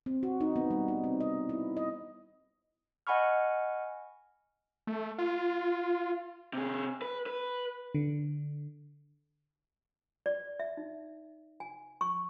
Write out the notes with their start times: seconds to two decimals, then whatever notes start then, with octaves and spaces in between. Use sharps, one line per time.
0.06 C4
0.23 F#4
0.41 D#4
0.56 B3
0.71 G3
0.88 D#4
1.04 C4
1.21 D#5
1.49 E4
1.77 D#5
3.07 D#5 F#5 G#5 B5 C#6 F6
4.87 A3
5.18 F4
6.53 C3 G#4
7.02 B4
7.26 B4
7.95 D3
10.26 D5
10.60 E5
10.77 D#4
11.60 G#5
12.01 C#6